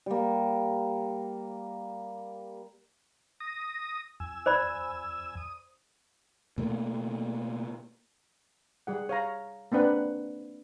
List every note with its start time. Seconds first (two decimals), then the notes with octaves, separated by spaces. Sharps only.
0.06 G3 A#3
3.40 D#6 A#6
4.20 F2 G#5 E6
4.46 C5 D5 B5
5.37 D#6
6.58 B2 A3 A#3
8.87 G3 G#4 F#5
9.09 C#5 F5 A#5
9.72 A#3 C4 D4 B4 F#5